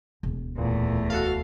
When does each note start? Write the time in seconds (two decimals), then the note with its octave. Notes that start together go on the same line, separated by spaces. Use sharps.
0.23 E1 D2
0.58 E2 A#2 A3
1.10 F#4 A4 F5